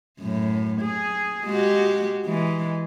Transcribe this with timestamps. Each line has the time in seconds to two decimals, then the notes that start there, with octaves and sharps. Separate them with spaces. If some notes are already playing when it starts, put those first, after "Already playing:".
0.19 F#2 A2
0.81 G#4
1.45 G#3 F#4 G4
2.25 E3 G#3